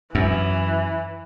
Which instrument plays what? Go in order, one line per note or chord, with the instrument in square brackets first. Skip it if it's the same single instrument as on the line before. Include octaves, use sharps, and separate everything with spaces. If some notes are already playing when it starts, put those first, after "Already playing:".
[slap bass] F#2 [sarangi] E3